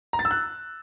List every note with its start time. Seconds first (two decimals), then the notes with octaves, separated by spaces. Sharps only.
0.13 A#5
0.19 A6
0.25 E6
0.31 F#6